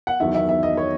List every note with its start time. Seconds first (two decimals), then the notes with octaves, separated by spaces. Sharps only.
0.07 F#5
0.20 E2 D#3 F#3 E5
0.35 E5
0.49 E5
0.63 D#5
0.77 C#5